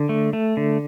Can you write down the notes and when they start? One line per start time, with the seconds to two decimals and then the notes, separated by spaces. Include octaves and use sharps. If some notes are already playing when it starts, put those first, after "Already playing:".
Already playing: D3
0.09 A3
0.33 A3
0.57 D3